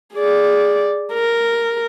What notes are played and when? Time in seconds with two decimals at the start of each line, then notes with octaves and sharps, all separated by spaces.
0.14 G#4 D5
1.13 A#4